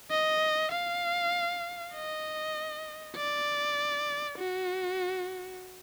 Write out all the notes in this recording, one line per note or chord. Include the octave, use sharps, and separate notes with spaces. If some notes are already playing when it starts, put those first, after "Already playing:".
D#5
F5
D#5
D5
F#4